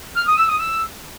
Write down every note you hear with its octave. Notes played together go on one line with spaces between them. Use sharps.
F6
D#6
E6
D#6
E6